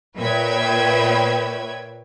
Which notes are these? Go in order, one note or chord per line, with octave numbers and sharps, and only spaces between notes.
A#2 B4 C#5 E5 G5 G#6